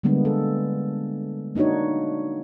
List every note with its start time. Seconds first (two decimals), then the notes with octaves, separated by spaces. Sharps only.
0.03 D3 G3 G#3 A#3 B3 D4
0.25 A4
1.55 A#3 D4 D#4 F#4 C#5